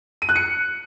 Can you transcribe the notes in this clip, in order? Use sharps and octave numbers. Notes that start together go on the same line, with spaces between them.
D#7
F#6
C#7